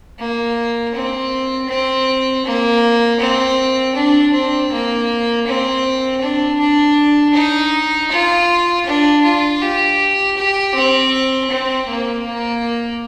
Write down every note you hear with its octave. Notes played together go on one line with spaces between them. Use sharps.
A#3
C4
C4
A#3
C4
D4
C4
A#3
C4
D4
D4
D#4
F4
D4
F4
G4
G4
C4
C4
A#3
A#3